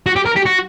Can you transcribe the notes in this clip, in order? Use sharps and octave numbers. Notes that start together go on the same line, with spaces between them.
F#4
G4
A#4
G4
F#4